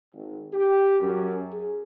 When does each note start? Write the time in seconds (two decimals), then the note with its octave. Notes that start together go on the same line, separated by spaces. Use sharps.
0.13 G#1
0.52 G4
1.00 F#2
1.50 G#4